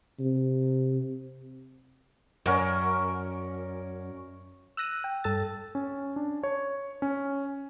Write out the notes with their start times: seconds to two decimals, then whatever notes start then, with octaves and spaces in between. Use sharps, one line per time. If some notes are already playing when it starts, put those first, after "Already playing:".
0.20 C3
2.46 F#2 C#4 A#4 D5
4.77 E6 F#6 A#6 D#7
5.04 G5
5.24 G2 A4 E6 A6
5.75 C#4
6.16 D4
6.43 C#5
7.02 C#4